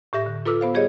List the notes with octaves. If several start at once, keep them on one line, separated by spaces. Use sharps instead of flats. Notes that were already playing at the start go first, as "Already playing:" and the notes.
A2 G4 E5 A#6
D3
F4 A4 B4 D6 E6 F6
B3 C5 F5
G3 G4 G#4 C5 C#5 D#5